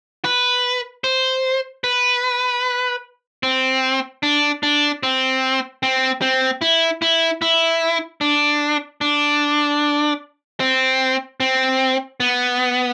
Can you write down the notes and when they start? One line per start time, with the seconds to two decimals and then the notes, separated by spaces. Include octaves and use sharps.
0.25 B4
1.04 C5
1.84 B4
3.43 C4
4.23 D4
4.63 D4
5.03 C4
5.83 C4
6.22 C4
6.61 E4
7.02 E4
7.42 E4
8.21 D4
9.01 D4
10.60 C4
11.40 C4
12.20 B3